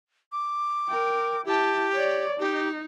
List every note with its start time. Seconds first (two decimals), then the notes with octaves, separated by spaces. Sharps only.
0.32 D6
0.88 A#4 G5
1.46 E4 G4 A5
1.94 C#5 D5
2.40 D#4 G4